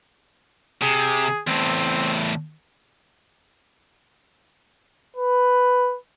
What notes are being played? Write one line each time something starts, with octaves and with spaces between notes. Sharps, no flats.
C3 G#4
E2 A2 C4
B4